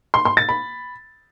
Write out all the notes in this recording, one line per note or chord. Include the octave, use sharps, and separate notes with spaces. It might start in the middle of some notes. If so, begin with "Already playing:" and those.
C6
C6
A6
B5